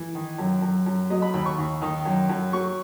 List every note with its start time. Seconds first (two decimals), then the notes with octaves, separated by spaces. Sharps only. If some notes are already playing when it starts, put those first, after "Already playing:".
Already playing: E3
0.15 D#3
0.39 F#2
0.62 F#2
0.86 F#2
1.10 F#3 D#5
1.22 B5
1.34 D#2 B5
1.46 C#6
1.58 D#2
1.82 D#3
2.06 F#2
2.30 F#2
2.53 F#3 C#6